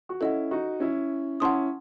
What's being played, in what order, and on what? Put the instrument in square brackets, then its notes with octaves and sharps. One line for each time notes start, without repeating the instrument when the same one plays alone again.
[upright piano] F#4
[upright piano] C#4 E4 [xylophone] A4 D#5 F#5
[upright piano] D#4 F#4
C#4 E4
[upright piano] C#4 E4 [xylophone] F#5 A5 C6 D#6